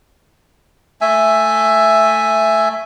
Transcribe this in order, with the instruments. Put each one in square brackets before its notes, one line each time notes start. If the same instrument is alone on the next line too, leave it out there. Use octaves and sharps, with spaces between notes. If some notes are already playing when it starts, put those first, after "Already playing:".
[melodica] A3 E5 G#5